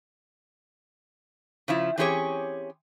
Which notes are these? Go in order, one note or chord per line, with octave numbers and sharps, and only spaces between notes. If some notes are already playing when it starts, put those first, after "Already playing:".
C#3 F3 E4
E3 C4 C#4 G4 G#4 C#5